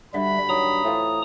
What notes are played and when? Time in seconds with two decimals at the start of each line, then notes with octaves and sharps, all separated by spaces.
0.14 G2 D3 G3 F#4 E5 B5
0.49 D#3 F#3 A#5 D#6
0.84 A2 E3 C4 F4